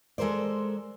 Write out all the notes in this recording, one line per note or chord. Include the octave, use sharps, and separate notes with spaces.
G#3 A4 A#4 C5 D5